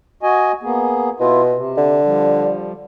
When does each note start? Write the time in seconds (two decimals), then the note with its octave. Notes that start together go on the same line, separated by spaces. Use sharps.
0.23 F#4 D#5 G#5
0.63 A#3 B3 G#4
1.20 B2 E4 F4
1.54 C3
1.77 D3
2.04 F3 G3